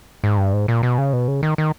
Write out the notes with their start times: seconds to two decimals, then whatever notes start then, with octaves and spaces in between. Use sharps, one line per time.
0.24 G#2
0.38 G2
0.53 G#2
0.68 A#2
0.83 B2
0.98 C#3
1.13 B2
1.28 C#3
1.43 D#3
1.58 D#3